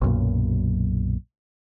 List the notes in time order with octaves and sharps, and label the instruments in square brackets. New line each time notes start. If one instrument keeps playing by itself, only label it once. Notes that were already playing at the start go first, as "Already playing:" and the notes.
[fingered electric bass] B1 F#2 A#2